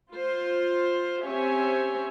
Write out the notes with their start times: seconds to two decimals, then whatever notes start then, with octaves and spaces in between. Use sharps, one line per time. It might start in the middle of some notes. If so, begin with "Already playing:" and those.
0.12 F4 C5
1.23 C4 C#4 G4 C#5 E5 G#5